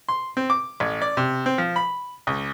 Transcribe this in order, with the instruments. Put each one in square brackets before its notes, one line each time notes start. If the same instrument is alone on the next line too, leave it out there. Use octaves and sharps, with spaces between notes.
[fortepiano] C6
C4
D6
A1
D5
C3
C4
F3
B5
C#2